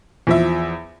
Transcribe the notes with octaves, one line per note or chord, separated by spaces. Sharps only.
E2 F3 E5